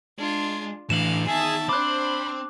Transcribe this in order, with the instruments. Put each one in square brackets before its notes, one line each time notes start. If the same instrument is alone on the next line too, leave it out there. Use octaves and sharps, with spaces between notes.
[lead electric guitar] G#3 [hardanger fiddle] D4 F4
[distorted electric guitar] A2 E3 [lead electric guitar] D3 [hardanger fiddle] F5 [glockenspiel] E7 F#7
[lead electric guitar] E2 D#3 [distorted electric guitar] G#4 [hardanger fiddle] E5 A5
[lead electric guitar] C4 [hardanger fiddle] D4 C5 [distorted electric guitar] B5 [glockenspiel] D6 F#6